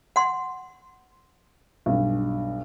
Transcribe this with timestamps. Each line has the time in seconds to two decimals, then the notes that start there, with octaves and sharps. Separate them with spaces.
0.16 F#5 C6
1.86 B1 G2